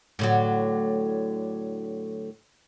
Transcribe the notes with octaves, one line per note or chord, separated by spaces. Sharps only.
A2 D3 F#3